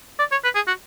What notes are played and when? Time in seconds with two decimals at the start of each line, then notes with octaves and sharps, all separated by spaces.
0.19 D5
0.32 C#5
0.44 B4
0.55 G#4
0.67 F#4